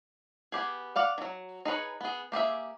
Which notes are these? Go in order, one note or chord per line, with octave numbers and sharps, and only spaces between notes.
B3 G4 G#4
D5 F5 F#5
D#3 F#3
D#4 G#4 B4 C#5
B3 G#4
A#3 G4 G#4 E5